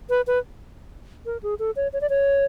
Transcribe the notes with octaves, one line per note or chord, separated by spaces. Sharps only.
B4
B4
A#4
G#4
A4
C#5
C#5
D5
C#5